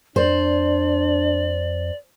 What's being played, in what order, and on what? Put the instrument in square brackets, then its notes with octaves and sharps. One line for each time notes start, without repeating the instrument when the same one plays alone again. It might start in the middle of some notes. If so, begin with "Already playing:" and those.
[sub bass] F2 [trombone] D4 [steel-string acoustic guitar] C5 [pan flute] D5